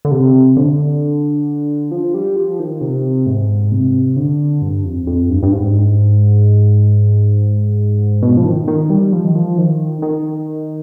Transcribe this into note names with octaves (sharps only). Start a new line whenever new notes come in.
D3
C3
D3
F3
G3
F3
D#3
C3
G#2
C3
D3
G2
F2
F2
G2
G2
G#2
B2
F3
D#3
D#3
G3
F3
D#3
F3
D#3
D#3